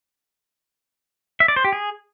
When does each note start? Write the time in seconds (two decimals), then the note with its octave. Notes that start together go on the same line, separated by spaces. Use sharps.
1.40 E5
1.48 D5
1.56 C5
1.64 G4
1.73 G#4